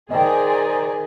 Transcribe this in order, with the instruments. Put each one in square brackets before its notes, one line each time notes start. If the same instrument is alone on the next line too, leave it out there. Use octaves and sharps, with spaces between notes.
[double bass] D#3 [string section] G#4 [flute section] C5 D5 A#5 [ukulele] D#5 G5